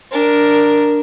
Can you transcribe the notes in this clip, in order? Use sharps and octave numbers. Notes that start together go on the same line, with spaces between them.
D4 A#4